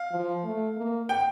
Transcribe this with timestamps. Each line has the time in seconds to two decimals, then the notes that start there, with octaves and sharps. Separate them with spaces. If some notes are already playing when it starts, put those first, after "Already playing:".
Already playing: F5
0.11 F3
0.44 A3
0.77 A#3
1.09 G5